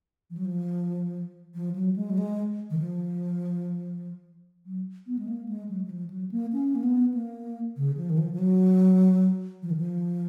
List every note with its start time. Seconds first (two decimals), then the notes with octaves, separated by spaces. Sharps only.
0.30 F3
0.37 F#3
0.45 F3
1.55 F3
1.76 F#3
1.96 G#3
2.10 F#3
2.18 G#3
2.70 D#3
2.79 F3
4.66 F#3
5.07 B3
5.19 G#3
5.28 A#3
5.48 G#3
5.69 F#3
5.84 F#3
5.90 F3
6.10 F#3
6.31 A#3
6.53 C#4
6.75 A#3
6.83 B3
7.14 A#3
7.77 C#3
7.97 F3
8.10 D#3
8.18 F3
8.33 F3
8.39 F#3
9.63 F3
9.71 D#3
9.77 F3